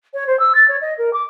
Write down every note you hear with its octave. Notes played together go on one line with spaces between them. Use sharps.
C#5
C5
E6
A6
C#5
D#5
A#4
D6